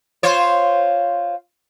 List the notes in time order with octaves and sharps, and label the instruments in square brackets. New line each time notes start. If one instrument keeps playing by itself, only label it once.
[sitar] F4 C5 C#5